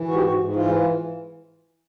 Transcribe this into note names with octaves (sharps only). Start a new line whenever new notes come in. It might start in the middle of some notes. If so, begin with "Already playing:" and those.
Already playing: E3
G#2 F#4
G4
G#2 F#4
G#2
E3 F4